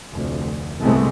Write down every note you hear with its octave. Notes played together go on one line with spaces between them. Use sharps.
F1 D2
C2 G#2 C3 G#3 A3 B3